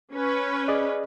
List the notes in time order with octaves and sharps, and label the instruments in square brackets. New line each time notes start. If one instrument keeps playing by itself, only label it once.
[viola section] C#4 B4
[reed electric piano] G#4 D5 D#5